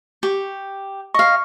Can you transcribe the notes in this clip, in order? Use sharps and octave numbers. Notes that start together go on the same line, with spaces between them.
G4 C#6
D#5 F5 C#6